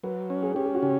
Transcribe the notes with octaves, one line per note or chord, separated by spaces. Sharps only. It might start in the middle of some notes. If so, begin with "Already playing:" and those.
F#3 B4
C#4
G#4
C#4 G4
G#4
F#4
C#3 G4